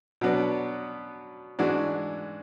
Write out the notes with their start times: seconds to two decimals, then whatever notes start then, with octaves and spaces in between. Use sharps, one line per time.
0.21 B2 F#3 B3 D4
1.59 G#2 E3 G#3 D4 F#4